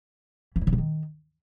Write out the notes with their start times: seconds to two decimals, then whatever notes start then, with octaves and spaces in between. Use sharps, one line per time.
0.56 E3
0.61 E4
0.67 D3
0.73 C#3
0.78 D#3